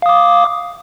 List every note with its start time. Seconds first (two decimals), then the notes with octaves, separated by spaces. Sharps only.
0.02 F5
0.06 D#6
0.09 D6